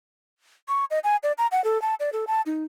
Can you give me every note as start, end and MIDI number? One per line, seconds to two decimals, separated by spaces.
0.68 0.85 85
0.91 0.99 75
1.04 1.16 80
1.23 1.32 74
1.38 1.47 82
1.52 1.63 78
1.64 1.80 69
1.82 1.94 81
2.00 2.10 74
2.13 2.25 69
2.27 2.41 81
2.46 2.64 63